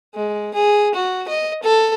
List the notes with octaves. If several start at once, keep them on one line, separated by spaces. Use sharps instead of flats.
G#3
G#4
F#4
D#5
A4